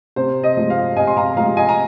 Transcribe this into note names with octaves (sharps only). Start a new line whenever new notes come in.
C3 C5
D#5
F3 G#3
C5 F5
C3 D#5 G#5
C6
F5 A#5
F3 G#3 F5 A#5
D#5 G#5
A#5